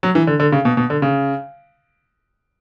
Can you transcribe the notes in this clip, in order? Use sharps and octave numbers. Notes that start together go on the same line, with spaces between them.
F#3
E3
D3
D3
C#3
B2
B2
D3
C#3